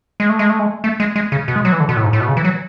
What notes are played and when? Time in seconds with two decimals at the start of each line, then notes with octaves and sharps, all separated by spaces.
0.20 G#3
0.29 A3
0.39 G#3
0.50 A3
0.59 G#3
0.84 A3
1.00 G#3
1.16 G#3
1.32 C#3
1.48 B2
1.56 G#3
1.65 F#3
1.72 E3
1.80 D3
1.89 B2
1.96 A2
2.04 G#2
2.13 A2
2.20 B2
2.28 C#3
2.37 E3
2.44 F#3